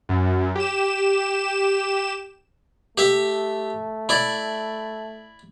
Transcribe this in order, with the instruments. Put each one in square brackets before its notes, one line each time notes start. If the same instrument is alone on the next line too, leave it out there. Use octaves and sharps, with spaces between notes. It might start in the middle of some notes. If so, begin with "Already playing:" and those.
[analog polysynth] F#2
G4 E7
[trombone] A3 [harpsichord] G4 E5
[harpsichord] E4 D5